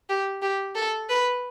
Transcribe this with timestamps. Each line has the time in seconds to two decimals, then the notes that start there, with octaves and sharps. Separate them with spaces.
0.09 G4
0.42 G4
0.75 A4
1.09 B4